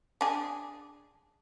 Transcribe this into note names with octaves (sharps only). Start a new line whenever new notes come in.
D4 G#4